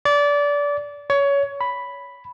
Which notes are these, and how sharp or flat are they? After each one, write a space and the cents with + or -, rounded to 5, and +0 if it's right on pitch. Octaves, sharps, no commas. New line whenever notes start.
D5 -25
C#5 +20
B5 +0